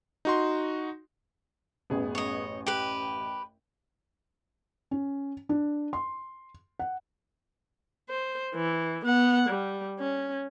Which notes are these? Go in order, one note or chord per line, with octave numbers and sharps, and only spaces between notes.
D#4 F#4 C6
A1 F#2 B3 G#4
C#5 D#5
G4 B4 G5
C#4
D4
C6
F#5
C5
E3
B3 F#5
G3
C#4